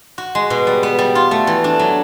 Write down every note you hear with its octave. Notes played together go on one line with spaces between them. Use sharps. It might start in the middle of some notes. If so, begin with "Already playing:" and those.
F#4
G#3
B2
G3
B3
G3
F4
A3
E3
D4
F#3